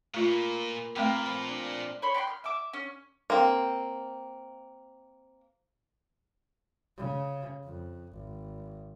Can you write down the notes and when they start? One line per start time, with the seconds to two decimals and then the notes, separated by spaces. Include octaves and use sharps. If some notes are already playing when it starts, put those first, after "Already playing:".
0.14 A#2 A3 A#3 F4 B4 D#5
0.96 A#2 A3 A#3 C4 F4 A#4 B4 G5
1.26 F3 C4 B5
1.48 D4
2.02 C#5 B5 C6
2.14 B4 G5 A5 C6
2.27 F6
2.44 E5 D6
2.73 C#4
3.30 A#3 C4
6.97 C#3
7.64 F2
8.12 G#1